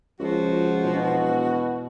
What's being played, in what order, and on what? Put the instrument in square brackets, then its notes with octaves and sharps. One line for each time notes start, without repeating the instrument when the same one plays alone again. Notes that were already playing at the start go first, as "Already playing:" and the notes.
[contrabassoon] C#2 [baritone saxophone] F3 [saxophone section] F#4
[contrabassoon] E1 [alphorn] B2